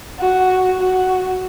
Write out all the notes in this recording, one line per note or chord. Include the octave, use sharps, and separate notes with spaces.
F#4
F#4